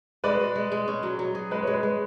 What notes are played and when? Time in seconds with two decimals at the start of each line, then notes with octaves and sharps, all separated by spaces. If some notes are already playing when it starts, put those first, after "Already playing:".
0.24 G#3 B4 D5
0.40 F#4
0.56 G#3
0.72 G#3
0.88 C#4
1.03 F#3
1.19 F#3
1.35 G#4
1.51 G#3 B4
1.63 G#3 C#5
1.74 B4
1.83 G#3